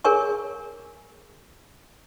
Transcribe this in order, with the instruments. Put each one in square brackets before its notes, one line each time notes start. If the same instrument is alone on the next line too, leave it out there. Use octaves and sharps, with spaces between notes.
[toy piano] G#4 A#4 C#5 G#5 C#6